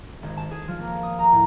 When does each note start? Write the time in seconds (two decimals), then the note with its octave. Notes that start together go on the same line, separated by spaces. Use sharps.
0.23 G#1
0.37 A5
0.51 G#4
0.68 F3
0.81 A#3
1.03 D#6
1.19 A#5
1.32 A2